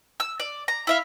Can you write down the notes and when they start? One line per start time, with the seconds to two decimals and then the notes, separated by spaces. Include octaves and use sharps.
0.20 E6
0.40 D5
0.68 A#5
0.87 E4 E5 F5